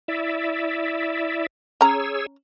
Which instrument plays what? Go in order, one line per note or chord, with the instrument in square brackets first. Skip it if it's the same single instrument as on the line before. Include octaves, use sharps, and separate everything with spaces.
[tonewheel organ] E4 D5 E5
[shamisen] C#4 A#5 [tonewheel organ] G#4 C#5 E6